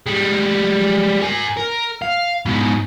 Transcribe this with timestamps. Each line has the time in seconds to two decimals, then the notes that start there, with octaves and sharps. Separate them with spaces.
0.06 G3 G#3
1.21 A#4 G#5
1.57 A#4
2.02 F5
2.46 G#2 B2